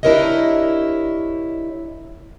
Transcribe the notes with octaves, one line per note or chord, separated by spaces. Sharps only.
D4 E4 G4 A#4 C#5 D#5